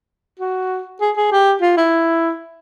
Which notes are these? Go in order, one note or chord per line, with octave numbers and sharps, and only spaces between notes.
F#4
G#4
G#4
G4
F4
E4